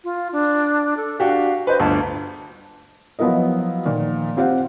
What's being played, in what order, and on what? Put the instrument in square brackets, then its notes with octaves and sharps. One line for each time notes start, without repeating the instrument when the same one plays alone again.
[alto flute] F4
D4
A4
[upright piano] D4 F#4 G4 [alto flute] F5
[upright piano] B4 D#5 [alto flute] C5
[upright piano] G1 D2 [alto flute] A5
[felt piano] F3 F#3 B3 E4 A#4 D#5
A#2 D#3 F3
C4 F4 G4 C5 F5 F#5